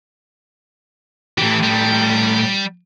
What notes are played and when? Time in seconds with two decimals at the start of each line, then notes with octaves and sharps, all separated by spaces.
1.38 A2 E3 G4
1.63 G3